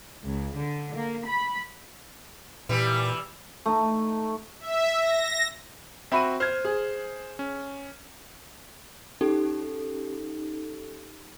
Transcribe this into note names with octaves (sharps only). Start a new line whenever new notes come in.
C#2
D3
A#3
B5
A#2 E3 G3
A3 D#4
E5
A#6
C4 F#4 E5 B5 D#7
C5 F6 G#6
G#4
C#4
C#4 D#4 G4 A4